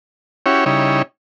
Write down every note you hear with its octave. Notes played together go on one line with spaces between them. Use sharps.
C#4 E4 F#4 G4 C#5
C#3 G3 D#4 E4 C#5